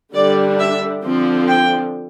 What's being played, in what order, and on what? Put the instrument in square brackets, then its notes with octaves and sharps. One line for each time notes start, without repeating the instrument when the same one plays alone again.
[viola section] D3 G3 D4 D5
E5
D3 F3 C4
G5